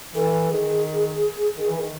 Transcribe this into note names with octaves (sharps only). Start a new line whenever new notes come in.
E3 A4
D#3 G#4
D#3
E3
D#3